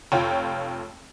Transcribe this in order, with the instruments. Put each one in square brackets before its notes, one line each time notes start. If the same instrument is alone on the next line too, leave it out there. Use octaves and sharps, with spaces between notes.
[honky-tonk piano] F1 F4 C#5 G5